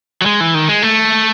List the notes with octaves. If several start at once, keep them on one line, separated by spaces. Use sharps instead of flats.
F#3
G#3
E3
D#3
G#3
A3